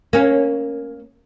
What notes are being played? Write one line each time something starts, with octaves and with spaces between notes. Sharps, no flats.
A#3 C#4